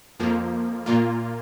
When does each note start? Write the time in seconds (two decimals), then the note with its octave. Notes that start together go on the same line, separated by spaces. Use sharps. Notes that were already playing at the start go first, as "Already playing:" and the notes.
0.20 F2 F3 A#3
0.86 A#2 A#3 F4